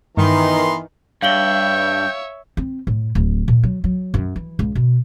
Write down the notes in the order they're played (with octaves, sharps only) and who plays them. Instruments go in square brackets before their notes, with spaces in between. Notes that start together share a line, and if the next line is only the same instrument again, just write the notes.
[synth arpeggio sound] G2 [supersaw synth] D#3 [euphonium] E3 [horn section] B3 A#5 C6
[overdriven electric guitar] G2 [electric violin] C#5 E5 [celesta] F5 F#7 G7 [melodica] G5
[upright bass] C4
A2
D1
A#2
F#3
F#3
F#2
E3
C#2
B2